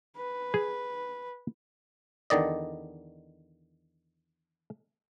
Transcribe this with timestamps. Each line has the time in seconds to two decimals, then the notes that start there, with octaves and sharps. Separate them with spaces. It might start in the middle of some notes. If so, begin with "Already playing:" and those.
0.17 B4
0.54 G#4
2.30 E2 D3 D#3 D5 D#5